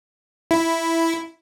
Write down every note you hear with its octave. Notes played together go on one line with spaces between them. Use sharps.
E4